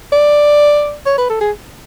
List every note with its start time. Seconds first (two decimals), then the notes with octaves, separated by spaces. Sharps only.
0.12 D5
1.06 C#5
1.18 B4
1.29 A4
1.41 G#4